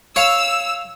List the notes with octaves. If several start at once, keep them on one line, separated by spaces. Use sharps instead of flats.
C#5 F5 E6